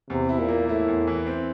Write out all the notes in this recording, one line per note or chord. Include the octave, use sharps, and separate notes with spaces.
E2 C3
E4
A#2
A#3
A2 E4
E2
E3
C4